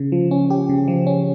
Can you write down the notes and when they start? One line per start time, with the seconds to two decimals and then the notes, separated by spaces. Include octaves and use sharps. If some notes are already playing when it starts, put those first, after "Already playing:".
Already playing: C#3
0.12 F3
0.31 C#4
0.50 G4
0.69 C#3
0.88 F3
1.07 C#4